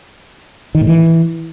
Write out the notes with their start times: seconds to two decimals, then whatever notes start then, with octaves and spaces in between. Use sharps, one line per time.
0.75 D#3
0.81 A2
0.87 E3